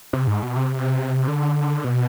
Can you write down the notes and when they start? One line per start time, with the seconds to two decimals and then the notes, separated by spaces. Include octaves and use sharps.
0.13 C3
0.27 G#2
0.43 B2
0.56 C3
1.28 D3
1.84 B2